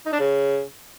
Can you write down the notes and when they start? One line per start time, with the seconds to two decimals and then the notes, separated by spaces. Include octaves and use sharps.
0.06 D#4
0.13 D4
0.20 C#3